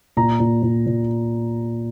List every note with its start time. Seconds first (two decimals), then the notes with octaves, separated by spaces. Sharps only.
0.17 A#2 A#5
0.40 A#2
0.63 A#2
0.86 A#2